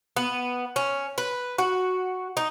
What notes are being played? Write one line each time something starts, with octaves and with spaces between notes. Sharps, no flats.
B3
C#4
B4
F#4
D#4